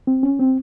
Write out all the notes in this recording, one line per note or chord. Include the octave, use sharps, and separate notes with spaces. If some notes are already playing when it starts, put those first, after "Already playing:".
C4
C#4
C4